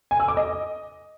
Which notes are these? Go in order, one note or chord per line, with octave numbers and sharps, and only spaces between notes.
G#5
E6
D6
D#5